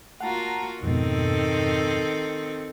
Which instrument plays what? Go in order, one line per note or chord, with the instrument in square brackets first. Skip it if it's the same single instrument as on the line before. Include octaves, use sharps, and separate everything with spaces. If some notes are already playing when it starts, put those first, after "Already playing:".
[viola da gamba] A#3 F4 F#4 [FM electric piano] F#5 A5 A#5
[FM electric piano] F2 G#2 B2 [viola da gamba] D#3 C4 A4